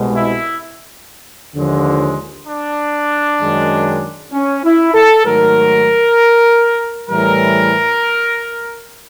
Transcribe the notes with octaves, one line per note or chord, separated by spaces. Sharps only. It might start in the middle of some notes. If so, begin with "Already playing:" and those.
Already playing: C2 B2 G#3
E4
D#2 D3 F3 G#3
D4
F#2 D#3 G#3
C#4
E4
A4
G#2 D#3 F#3 A3 A#4
A2 E3 G3 A#4